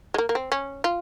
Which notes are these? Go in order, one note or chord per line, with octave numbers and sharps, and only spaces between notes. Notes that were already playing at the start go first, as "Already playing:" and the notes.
G#3
A#3
A#3
C4
C#4
F4